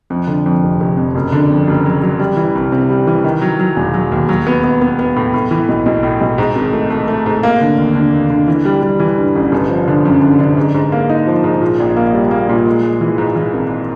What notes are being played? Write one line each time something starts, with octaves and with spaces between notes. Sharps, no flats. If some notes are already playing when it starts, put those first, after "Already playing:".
F2
D3
F2
F1
F1
F2
F#1
D3
F2
F#1
F#3
F#3
G3
E3
C2
C3
G3
E3
D#3
F#3
F#3
E1
F#3
D#2
F#3
B3
B3
B3
B3
A2
A2
E3
B1
B1
A2
B1
G#2
G#1
A3
A3
A3
G#2
A#3
D3
D#2
D3
D#2
D3
E3
G3
G3
E3
G2
A1
G1
F3
D3
F#2
D3
D3
G#2
G#2
A#3
D#4
F3
G#2
A#2
A#1
A#3
G3
A#3
A#2
G#3
G#3
E3
G#2
E3
G#1